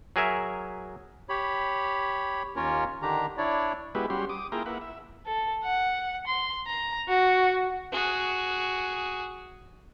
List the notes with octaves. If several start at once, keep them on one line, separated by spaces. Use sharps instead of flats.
F#3 G#4 A#4 E5
G4 C#5 B5
D#2 A#3 C#4 F4 A#4 C#5
D3 D#3 D4 G4 A#5
D4 E4 C#5 D5
G#3 B3 E4 F#4 G4 B4
G3 C#4 F#4 G4 C6
D6 D#6
A#3 E4 F4 G#4 G5 A#5
A#3 E4 B4 F#5
E5
A4
F#5
C6
A#5
F#4
F#4 G#4